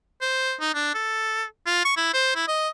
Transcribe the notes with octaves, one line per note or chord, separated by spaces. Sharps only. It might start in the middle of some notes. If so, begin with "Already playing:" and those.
C5
D#4
D4
A4
F4
C#6
E4
C5
E4
D#5